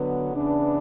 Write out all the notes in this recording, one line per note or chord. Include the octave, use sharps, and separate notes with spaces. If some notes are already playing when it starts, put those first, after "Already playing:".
Already playing: D3 F#3 B3
C#3 E3 B3 D4